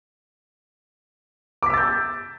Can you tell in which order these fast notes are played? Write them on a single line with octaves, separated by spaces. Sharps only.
D6 B6 E6 A6 G6